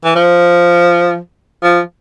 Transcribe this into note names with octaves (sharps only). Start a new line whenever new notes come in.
E3
F3
F3